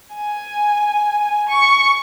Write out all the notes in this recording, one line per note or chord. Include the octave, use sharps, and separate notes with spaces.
G#5
C#6